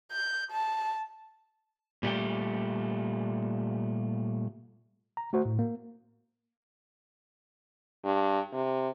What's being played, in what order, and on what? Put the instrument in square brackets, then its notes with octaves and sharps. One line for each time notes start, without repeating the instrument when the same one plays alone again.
[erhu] G6
A5
[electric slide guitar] A#2 G3 A3 G4
[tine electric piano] A#5
A3 F#4 C5
A2
A#3
[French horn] G2
C3